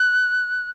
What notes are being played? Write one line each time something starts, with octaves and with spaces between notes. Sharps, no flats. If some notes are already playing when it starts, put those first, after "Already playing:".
Already playing: F#6